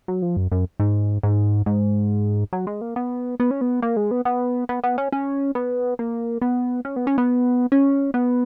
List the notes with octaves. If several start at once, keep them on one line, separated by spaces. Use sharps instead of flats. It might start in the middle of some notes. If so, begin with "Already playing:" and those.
F#3
F3
F#2
F#2
G#2
G#2
G#2
F#3
G#3
A#3
B3
B3
C#4
B3
A#3
G#3
B3
B3
B3
B3
C#4
C#4
B3
A#3
B3
C#4
B3
C#4
B3
C#4
B3